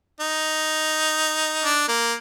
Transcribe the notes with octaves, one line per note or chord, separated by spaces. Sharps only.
D#4
D4
A#3